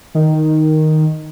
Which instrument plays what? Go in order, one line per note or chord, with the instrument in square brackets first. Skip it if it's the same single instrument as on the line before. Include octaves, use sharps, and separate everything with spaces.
[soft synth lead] D#3